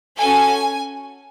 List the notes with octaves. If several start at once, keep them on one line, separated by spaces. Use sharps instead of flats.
C#4 F#4 A4 G#5